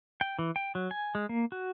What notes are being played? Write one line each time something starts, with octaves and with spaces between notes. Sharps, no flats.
G5
E3
G5
F#3
G#5
G#3
A#3
F#4